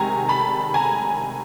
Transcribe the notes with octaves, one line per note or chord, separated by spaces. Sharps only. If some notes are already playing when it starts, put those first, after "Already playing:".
Already playing: C3 D#3 G#3 G#5 A#5
A5 B5
G#5 A#5